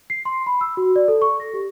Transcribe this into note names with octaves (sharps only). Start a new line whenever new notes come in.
C7
C6
B5
E6
F#4
D5
A4
C#6
A#6
G4